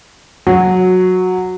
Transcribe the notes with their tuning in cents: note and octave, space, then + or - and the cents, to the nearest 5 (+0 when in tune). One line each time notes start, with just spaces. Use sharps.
F#3 -10